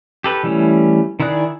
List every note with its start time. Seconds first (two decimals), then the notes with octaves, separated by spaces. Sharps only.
0.24 G4 A4 B4
0.43 E3 G3 A3 C#4
1.20 D#3 E4 G#4 D5 F#6